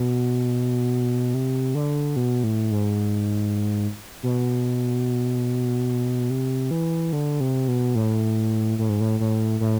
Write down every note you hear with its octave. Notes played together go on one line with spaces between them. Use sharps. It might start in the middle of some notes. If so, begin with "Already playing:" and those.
Already playing: B2
C3
D3
B2
A2
G#2
B2
C3
E3
D3
C3
B2
A2
A2
G#2
A2
A2
A2